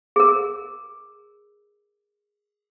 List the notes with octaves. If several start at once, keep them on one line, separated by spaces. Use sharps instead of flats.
G#4 A#4